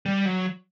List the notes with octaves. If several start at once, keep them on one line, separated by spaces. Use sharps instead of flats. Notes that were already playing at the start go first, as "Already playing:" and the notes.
G3
F#3